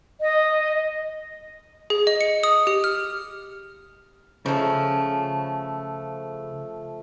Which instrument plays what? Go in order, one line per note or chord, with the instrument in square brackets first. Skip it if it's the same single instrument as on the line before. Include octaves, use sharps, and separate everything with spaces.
[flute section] D#5
[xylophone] G#4
D#5
C#7
D#6
G4
F6
[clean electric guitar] C#3 [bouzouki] F3 A3